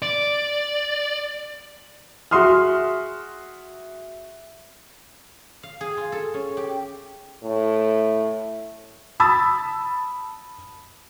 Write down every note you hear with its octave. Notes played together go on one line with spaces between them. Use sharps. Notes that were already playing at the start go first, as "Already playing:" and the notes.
D5
F#4 G#4 E5 C6 D#6 F6
F5
G#4
F4
A4
C#4
G4
A2
A5 B5 D#6 E6 A6